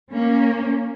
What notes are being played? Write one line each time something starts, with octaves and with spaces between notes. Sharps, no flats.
A#3 C#4